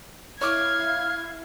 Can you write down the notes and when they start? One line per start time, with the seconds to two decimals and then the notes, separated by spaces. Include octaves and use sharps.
0.41 E4 C#5 F5 D6 F6 G#6